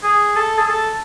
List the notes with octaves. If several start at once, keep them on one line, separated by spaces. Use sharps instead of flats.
G#4
A4
G#4
A4